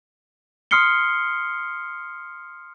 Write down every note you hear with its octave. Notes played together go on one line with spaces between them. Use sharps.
C6 D#6 F6 C7 C#7 G7